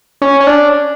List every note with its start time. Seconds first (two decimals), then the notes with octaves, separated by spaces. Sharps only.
0.22 C#4
0.40 C#4
0.47 D4